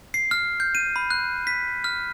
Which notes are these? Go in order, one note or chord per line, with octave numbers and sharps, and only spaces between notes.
C7
F6
G6
D#7
B5
F#6
B6
F6